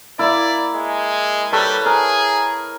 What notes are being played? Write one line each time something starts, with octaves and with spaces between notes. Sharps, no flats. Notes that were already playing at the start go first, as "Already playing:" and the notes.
A#3 E4 D5
G#3
G3 A4 B4 C#5
G#4 A#4